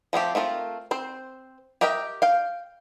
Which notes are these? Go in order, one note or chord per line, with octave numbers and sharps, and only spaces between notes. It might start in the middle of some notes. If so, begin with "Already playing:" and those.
F3 A3 C4 G4
A3 C4 F4 A#4
C4 C5
G4 A#4 D#5 E5 G5
F5 G5